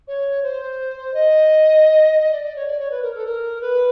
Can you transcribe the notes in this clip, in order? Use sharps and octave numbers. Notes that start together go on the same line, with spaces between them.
C#5
C5
D#5
D#5
D5
D5
C#5
D5
C#5
B4
A#4
A4
A#4
B4